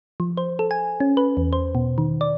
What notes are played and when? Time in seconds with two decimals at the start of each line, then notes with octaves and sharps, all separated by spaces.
0.20 F3
0.37 C5
0.59 A4
0.71 G#5
1.00 C#4
1.17 B4
1.37 E2
1.53 C5
1.75 B2
1.98 D#3
2.21 D5